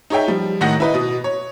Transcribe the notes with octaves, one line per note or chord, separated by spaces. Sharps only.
D#4 G#4 C#5 E5 G5
F3 G3
A2 D#3 D#4 F#5 A#6
E4 B4 D#5
B2 D#6
C#5